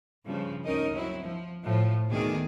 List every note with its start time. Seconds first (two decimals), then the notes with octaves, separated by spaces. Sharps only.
0.25 G2 C#3 F3
0.64 D2 C#4 D#4 A#4 D#5
0.94 F#3 C4 E4
1.24 F3
1.63 A2 F3
2.09 D2 B2 D#3 G#4 D5